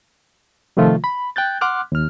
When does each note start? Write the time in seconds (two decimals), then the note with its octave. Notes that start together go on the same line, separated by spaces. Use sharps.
0.77 C3 D#3 F3 A3 F4
1.04 B5
1.36 G5 F#6 G6 A6
1.61 F#5 C6 D6 F6 F#6
1.92 D#2 F6